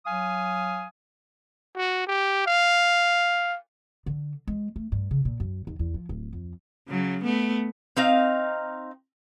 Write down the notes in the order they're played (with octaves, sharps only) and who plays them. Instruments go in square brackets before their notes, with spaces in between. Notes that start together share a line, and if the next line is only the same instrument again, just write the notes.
[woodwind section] F#3 F5 G#5 D#6
[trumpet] F#4
G4
F5
[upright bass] D3
G#3
A3
G2
C#3
A#2
F#2
D#2
E2
F3
D1
F2
[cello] C#3 F#3
A3 B3
[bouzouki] C4 D#4 F5